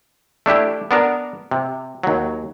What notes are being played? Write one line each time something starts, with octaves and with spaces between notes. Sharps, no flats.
A3 D4 E4 G4
B3 D4 A#4
C3
D#2 F#3